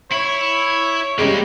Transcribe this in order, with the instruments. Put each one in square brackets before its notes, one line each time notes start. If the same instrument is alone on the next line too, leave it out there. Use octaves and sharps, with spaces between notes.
[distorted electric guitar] E4 [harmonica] C#5
[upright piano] C#3 G3 G#3 [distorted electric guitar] A#3 G4